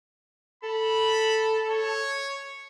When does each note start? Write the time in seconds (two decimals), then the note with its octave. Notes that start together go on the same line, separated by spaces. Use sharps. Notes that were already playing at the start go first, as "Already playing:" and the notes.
0.63 A4 B5
1.70 C#5